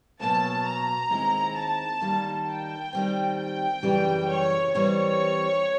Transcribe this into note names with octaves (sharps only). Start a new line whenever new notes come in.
B2 F#3 A#3 C#4 F#4 A5
A#5
D#2 D#3 G#3 C4 E4
A5
D#3 G3 A#3 D#4
G5
D#3 G3 C4
G5
F#2 C#3 E3 G3
C#5
E3 G3 C4 C#5